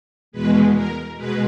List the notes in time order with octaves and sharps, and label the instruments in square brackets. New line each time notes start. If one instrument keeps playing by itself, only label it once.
[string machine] E2 B2 G#3 B4
A#4
B2 G#3 B4